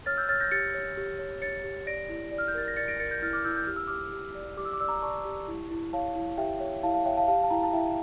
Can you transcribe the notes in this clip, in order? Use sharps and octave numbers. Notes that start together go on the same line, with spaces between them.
C#5 F6 A6
E6 G6
C#5 F6 A6
G6 A#6
G4 A6 C#7
C#5
G4
C#5
C#5 A6 C#7
G4
D5 A#6 D7
E4
D5
F6
G6
A#4 A6
A#6
D5 A6 C#7
A#6 D7
A#4 A6 C#7
G6 A#6
E4 F6 A6
D6 F6
E4 E6 G6
G6
G4 F6
E6
G4 D6 F6
G4
D5
G4 D6
E6
D6
D5 E6
A#5 D6
D5 A5 C#6
G4
E4
E4
C#5 F5 A5
E4
G4 E5 G5
C#5
E4 F5 A5
F5 A5
C#5 E5 G5
F5 A5
G4 F5 A5
A5
E4 G5 A#5
A5
E4 E5 G5